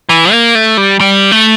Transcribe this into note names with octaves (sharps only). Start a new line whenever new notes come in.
E3
A#3
A3
G3
G3
A3